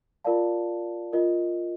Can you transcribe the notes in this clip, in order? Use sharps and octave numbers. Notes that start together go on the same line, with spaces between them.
F4 A#4 D5 F5 A5
F4 A#4 D#5